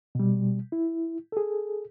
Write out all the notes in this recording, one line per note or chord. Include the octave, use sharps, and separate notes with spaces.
B2 G3
E4
G#4 A4